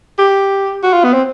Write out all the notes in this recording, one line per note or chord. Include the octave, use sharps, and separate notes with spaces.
G4
F#4
F4
B3
C4